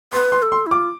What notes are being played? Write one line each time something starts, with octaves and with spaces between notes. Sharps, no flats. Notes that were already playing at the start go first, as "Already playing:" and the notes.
B4 C6
C6
A4
C6
E4
F4 D6